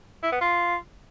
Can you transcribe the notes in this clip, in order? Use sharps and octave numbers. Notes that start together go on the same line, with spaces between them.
E4
B3
F4